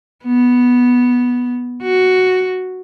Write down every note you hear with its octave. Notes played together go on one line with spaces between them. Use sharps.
B3
F#4